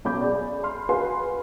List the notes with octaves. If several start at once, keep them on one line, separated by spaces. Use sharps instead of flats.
B1 C#4 C#5 B5 D6 G6
G#4 D5
B5 C6 F6
F#4 G#4 B4 F5 G#5 C6